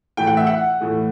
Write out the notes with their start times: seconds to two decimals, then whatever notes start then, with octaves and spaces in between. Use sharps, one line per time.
0.17 A2 E3 A3 G5
0.27 F#5
0.37 E5
0.47 F#5
0.80 A2 E3 A3